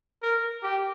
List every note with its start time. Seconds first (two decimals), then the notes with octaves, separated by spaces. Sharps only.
0.22 A#4
0.63 G4